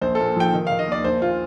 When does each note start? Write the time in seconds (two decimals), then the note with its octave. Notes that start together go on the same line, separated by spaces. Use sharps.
0.01 A#1 C5
0.15 A4
0.20 A#2
0.36 F3 G5
0.53 D#3
0.67 D#3 F5
0.79 D#5
0.87 D#2 D5
1.04 A#1 C5
1.22 A#2 F4